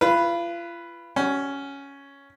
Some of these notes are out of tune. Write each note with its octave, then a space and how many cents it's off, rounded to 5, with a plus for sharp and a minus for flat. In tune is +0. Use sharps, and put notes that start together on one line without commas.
F4 -35 B4 +0
C#4 +5 F#4 +35